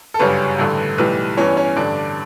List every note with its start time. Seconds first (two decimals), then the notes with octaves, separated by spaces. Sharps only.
0.14 A4
0.19 G1 F#2 C#3 G3 C#4 B4
0.59 A1 G2 D3 A3
0.98 B1 A2 E3 G3 B4
1.37 G2 E3 B3 C#4 C#5
1.57 C#4 C#5
1.77 A1 G2 D3 D4 D5